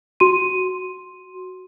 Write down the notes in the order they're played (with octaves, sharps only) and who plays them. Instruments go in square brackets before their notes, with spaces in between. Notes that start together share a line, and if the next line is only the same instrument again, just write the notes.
[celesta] F#4 C6 D#7